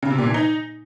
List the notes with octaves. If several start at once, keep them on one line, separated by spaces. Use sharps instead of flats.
C#3
C3
A#2
E3
D#4